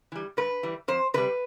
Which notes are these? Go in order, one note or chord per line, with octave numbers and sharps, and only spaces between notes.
E3 G3
G2 B4
E3 G3
F2 C5
C3 G3 B4